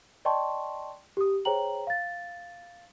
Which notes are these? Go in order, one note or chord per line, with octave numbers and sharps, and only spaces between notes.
D5 D#5 G5 A5 C6 C#6
G4 D#6
G#4 C5 C#5 G5 A#5 F#7
F5 A6